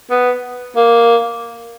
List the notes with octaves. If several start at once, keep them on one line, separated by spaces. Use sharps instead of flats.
B3
A#3